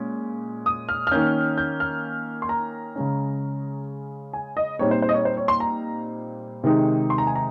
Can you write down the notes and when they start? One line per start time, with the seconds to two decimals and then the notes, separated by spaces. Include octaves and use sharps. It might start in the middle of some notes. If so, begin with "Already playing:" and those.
Already playing: A#2 G#3 C#4
0.66 D#6
0.89 F6
1.07 F6
1.11 D#3 A#3 C#4 G6
1.58 G6
1.80 F6
2.42 C6
2.49 A#5
2.96 C#3 G#3 C#4
4.33 G#5
4.57 D#5
4.79 A#2 G3 C4 D#4 C#5
4.91 C5
5.02 C5
5.09 D#5
5.14 C#5
5.25 C5
5.37 C#5
5.48 C6
5.60 A#5
6.64 C3 D#3 G#3 D#4
7.10 C6
7.18 A#5
7.27 G#5
7.35 A#5